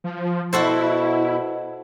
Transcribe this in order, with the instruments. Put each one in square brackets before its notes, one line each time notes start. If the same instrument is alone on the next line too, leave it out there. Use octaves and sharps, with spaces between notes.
[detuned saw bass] F3
[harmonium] B2 [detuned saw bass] E4 [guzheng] F#4 A4 C5